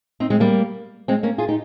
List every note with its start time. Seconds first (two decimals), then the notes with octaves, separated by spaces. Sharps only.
0.20 C4 D#4
0.30 G#3 C4
0.40 G3 A#3
1.08 G#3 C4
1.23 A#3 C#4
1.38 F4 G#4
1.48 D#4 G4